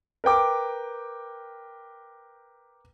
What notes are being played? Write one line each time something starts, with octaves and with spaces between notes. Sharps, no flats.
A#4 B4 G5 D6